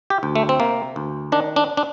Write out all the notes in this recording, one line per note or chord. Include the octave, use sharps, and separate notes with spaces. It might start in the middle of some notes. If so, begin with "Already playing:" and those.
G4
D2
A3
C4
C3 A#3
D2
D#3 D4
D4
D4